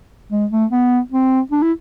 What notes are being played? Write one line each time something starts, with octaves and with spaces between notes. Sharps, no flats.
G#3
A3
B3
C4
D4
E4